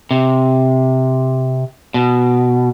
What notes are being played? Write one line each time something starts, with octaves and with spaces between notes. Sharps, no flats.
C3
B2